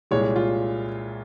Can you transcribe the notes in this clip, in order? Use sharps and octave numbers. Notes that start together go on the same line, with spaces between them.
C2 A#2 G#3 C#5
F4